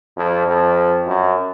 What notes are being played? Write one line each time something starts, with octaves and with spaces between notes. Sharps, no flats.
F2
F2
F#2